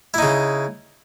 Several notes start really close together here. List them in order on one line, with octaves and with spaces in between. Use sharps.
E4 D#4 C#3